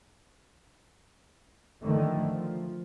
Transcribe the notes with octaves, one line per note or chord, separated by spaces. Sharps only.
D3 D#3 F3 A3
F3